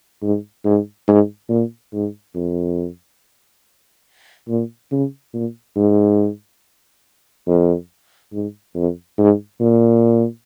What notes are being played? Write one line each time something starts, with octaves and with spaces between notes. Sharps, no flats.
G#2
G#2
G#2
A#2
G#2
F2
A#2
C#3
A#2
G#2
F2
G#2
F2
G#2
A#2